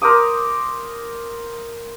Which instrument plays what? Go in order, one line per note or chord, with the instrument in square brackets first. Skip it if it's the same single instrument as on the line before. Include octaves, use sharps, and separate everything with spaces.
[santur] A#4 C5 D6 D#6